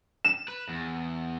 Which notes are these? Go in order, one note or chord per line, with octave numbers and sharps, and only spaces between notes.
E7
B4
E2